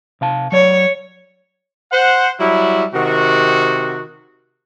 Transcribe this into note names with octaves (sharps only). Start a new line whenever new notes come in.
C3 F5 A5
F#3 C#5 D5
C5 F#5
F#3 G3 E4
C3 D#3 F#4